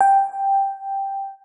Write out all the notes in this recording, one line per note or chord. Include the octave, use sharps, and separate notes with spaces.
G5